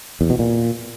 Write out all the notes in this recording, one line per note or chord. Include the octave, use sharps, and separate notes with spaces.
E2
B2
A#2